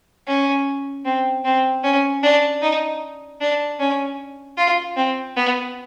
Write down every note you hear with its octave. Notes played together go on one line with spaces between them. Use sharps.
C#4
C4
C4
C#4
D4
D#4
D4
C#4
F4
C4
B3